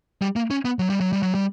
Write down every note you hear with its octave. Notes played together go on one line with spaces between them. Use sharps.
G3
A#3
C#4
B3
F#3
G3
F#3
G3
F#3
G3